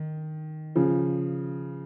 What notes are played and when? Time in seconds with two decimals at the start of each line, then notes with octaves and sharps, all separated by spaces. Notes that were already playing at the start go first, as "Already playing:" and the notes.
Already playing: D#3
0.76 C#3 F3